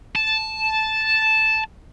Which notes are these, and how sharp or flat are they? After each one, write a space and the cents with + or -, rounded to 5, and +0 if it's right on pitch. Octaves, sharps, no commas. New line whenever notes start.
A5 -5